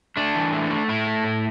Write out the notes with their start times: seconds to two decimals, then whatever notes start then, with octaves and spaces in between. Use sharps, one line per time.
0.17 A3 D4
0.35 E3
0.52 A3
0.70 A3
0.88 A2 E4
1.07 A3
1.24 A2